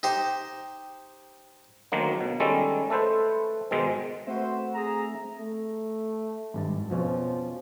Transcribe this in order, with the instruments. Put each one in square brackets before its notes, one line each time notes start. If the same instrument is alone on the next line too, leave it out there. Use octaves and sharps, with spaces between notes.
[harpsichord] D#4 G4 C5
[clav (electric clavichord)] D2 D#3 F#3 A#3
B2
D#3 G3 G#3 C#4 A4
A3 A4 B4 C5
G#2 B2 D#3 G#3
[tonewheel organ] A3 C4 E5 [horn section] F#4 B4 C5
[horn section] G#4 A#5
[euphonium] A3
[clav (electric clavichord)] G#1 G2 A5
[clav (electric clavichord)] F2 B2 C#4 [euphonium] F3